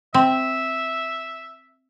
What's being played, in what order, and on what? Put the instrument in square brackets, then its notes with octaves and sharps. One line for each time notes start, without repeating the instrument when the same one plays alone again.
[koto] C4 [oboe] E5